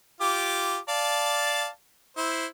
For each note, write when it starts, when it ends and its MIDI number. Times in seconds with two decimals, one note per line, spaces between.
0.21 0.77 65
0.21 0.77 67
0.21 0.77 86
0.89 1.67 74
0.89 1.67 77
0.89 1.67 81
2.17 2.46 64
2.17 2.46 72